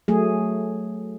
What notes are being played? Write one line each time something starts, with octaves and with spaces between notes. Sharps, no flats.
F#3 A3 G#4